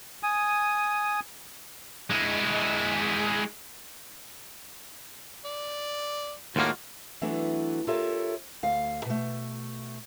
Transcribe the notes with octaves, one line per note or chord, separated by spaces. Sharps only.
G#5 D#6
G#3 E4
D5
D#2 A2 G#3 A#3 F4 F#4
E3 F#3 A3 B3 D4
F4 G4 A4 A#4 C#5 E5
D2 F5
B2 A3